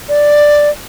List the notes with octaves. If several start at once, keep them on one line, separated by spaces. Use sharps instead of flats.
D5